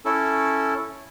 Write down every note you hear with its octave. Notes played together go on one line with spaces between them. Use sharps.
C#4 E4 A4